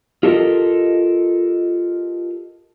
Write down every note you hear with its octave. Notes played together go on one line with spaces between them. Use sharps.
F4 G4 A4 A#4 D#5